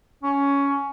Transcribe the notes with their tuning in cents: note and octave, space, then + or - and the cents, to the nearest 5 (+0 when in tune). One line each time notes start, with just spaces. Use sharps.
C#4 +10